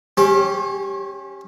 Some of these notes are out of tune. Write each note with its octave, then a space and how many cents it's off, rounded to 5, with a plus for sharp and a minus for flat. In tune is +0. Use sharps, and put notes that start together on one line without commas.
C#4 +0 G4 +0 C5 +45